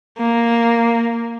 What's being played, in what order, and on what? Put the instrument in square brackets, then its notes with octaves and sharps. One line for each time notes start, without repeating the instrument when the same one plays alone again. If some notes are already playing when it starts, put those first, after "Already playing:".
[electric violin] A#3